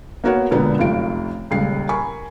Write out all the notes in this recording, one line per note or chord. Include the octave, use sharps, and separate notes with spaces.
A#3 B3 F#4 A#4 C#5 F#5
E1 A#2 D3 B3 A#5
F1 F#2 F4 D7
D#1 C#2 C#3 F5 C7
A#4 G#5 B5 C#6